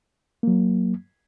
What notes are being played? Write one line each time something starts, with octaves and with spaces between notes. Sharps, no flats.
F#3 A#3